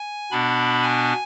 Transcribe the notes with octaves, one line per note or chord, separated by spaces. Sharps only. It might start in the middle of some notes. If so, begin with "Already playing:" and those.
Already playing: G#5
B2 B3 D4 B5
G#5